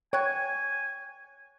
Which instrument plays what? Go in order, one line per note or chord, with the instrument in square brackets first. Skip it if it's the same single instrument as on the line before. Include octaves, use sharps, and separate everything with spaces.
[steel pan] C#5 [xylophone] G5 F#6 G#6 [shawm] G#5